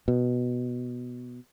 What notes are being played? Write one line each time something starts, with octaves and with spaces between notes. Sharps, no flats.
B2